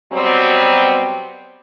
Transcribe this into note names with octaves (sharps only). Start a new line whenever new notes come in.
B2 F#3 G3 B3 C4